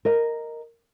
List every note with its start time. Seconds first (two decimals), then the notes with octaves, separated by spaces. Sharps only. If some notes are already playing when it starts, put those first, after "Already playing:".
0.05 A#4 D#5